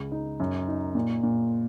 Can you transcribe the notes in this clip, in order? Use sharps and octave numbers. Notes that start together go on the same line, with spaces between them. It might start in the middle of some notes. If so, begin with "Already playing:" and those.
Already playing: C#2
D#4
F#2
D#4
A#2
A#2